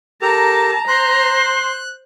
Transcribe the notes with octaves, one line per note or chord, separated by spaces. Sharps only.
G4 A4 A#4 A5 A#5
C5 C6 F#6